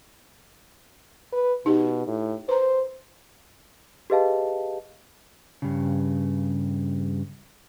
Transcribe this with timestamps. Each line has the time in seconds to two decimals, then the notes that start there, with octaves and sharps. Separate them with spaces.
1.33 B4
1.66 B2 D#4 G4
2.07 A2
2.49 B4 C5 A#5
4.10 G4 G#4 B4 D#5 F5 A5
5.62 G2 C#3